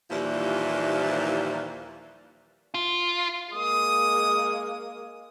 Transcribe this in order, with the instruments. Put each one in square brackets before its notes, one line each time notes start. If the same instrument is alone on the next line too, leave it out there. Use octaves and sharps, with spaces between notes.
[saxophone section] D#2 A#2 E3 F3 G3 E4
[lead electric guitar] F4
[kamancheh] G#3 A#3 [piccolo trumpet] D#6